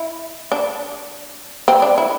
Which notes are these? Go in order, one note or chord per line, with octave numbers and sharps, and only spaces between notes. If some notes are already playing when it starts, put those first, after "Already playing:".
Already playing: E4
D4
C4
D4
E4